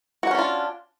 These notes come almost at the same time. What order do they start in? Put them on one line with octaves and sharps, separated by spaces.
F#4 F#5 C#4 D4 F4